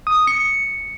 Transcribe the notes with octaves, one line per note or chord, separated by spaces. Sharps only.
D#6
C#7